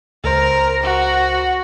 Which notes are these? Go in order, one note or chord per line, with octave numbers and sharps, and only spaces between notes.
C#2 A#4 C5
F#4